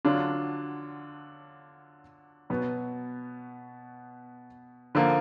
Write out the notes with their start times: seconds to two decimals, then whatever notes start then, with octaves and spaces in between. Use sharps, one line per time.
0.05 D3 F#3 D4 F4
2.50 B2 F#3 B3
4.95 D3 F3 A#3